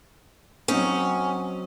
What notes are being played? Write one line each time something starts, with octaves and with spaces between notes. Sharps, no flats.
F#3 C4 C#4 D#4